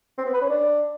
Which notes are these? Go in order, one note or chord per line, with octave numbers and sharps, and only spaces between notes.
C4
B3
B4
C#4
D4